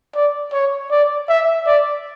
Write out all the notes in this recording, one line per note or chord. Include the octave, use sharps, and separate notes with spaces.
D5
C#5
D5
E5
D5